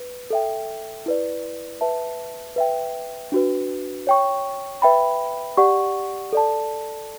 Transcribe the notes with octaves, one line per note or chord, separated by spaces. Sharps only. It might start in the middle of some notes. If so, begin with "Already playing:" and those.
Already playing: B4
A4 E5 G5
E4 B4 D5
B4 E5 A5
B4 E5 G5
D4 F#4 B4
C#5 G5 C#6
B4 E5 G5 B5
G4 D5 F#5 C#6
A4 D5 A5